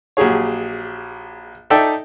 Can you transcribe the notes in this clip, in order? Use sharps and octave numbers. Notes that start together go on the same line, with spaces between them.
A#1 F#3 G4 G#4 C#5
D#4 A4 D5 E5 G5